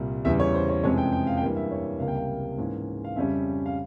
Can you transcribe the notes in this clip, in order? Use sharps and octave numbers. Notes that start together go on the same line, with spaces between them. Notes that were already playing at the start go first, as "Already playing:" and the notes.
Already playing: C2 A#2 G3
E2 C#3 E3 G3 E5
C#5
C5
C#5
F2 C3 E3 G#3 C#4 C#5
G5
G5
F5
G5
G2 E3 G3 A#3 F5
E5
C#5
C#2 C3 G3 A#3 F5
G5
F5
G#2 E3 A#3 C#4
F5
F2 C#3 G3 C#4 E5
F5